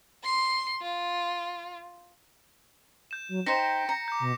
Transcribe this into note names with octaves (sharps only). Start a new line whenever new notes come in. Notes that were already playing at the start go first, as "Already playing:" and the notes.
C6 C7
F4
G6 E7
F#3
D#4 C5 G5 A#6 B6 C#7
A#5 C#7
D6 G6
B2